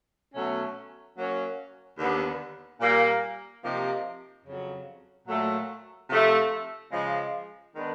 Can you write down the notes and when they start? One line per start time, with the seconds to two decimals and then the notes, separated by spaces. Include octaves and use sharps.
0.34 B2 F#3 A3 C#4
1.17 F#3 A#3 C#4
1.98 D#2 D3 G3 B3
2.81 A#2 G3 A#3
3.63 C3 F3 A#3 D#4 G4
4.45 F2 C#3 F#3
5.27 A#2 F#3 A3
6.09 C3 F3 A3
6.92 C#3 F3 G#3
7.74 D#3 G#3 B3 D4